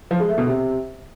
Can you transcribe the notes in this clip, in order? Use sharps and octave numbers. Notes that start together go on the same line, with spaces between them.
F3
G#3
A3
B2
C3